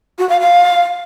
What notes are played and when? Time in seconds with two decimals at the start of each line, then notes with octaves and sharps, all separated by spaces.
0.19 F#4
0.29 F5
0.40 F5